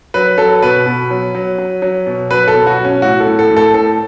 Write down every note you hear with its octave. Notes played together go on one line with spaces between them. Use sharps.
F#3 B4
F#3 A4
B2 B4
B2
F#3
F#3
F#3
F#3
B2
F#3 B4
A4
B2
F#4
F#3
C#4
A2 F#4
A4
A2
A4
A2
A4
A2 A4